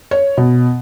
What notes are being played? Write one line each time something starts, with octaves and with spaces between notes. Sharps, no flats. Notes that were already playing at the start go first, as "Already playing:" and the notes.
C#5
B2